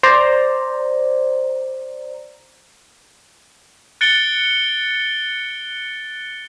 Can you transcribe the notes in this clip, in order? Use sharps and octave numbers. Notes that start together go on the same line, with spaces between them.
C5 D5 A#5
F#6 A6 C#7 D7 G7